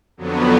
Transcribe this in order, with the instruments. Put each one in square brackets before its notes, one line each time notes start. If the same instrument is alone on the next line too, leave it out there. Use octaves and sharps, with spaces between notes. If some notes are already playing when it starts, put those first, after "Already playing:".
[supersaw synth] F2 D3 F#3 B3